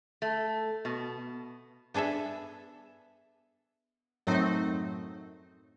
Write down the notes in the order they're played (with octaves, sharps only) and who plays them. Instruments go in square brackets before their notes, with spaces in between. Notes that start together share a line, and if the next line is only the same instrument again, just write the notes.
[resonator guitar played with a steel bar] A3
B2
[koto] B3 D4 G#4 A4 E5
[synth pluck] F#2 A2 F#3 A3 C4 D#4